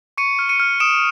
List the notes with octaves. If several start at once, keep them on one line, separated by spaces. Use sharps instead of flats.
C#6 C#7 D#7
F6
C#7 D#7
F6
D#6 D7 E7